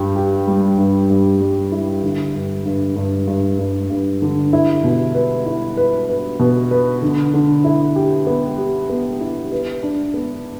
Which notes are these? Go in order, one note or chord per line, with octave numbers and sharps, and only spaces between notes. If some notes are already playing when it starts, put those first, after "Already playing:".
Already playing: G2 G4
G4
G3
G2
G2
G3
E4
D3
G2
G2
G2
G2
G2
G2
D3
E4
B2
B4
E4
B4
B4
B2
B4
D3
D3
E4
G4
B3
G4
B3
E4
B4
D4
B3